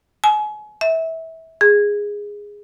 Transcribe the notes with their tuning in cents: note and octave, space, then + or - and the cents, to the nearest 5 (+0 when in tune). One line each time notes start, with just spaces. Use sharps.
G#5 +35
E5 -25
G#4 -10